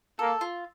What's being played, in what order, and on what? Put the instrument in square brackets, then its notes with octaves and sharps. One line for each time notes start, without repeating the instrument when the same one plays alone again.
[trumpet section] A#3 [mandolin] A4
[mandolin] F4